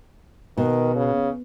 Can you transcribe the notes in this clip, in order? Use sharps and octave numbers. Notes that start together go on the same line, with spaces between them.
B2 D#3
C#3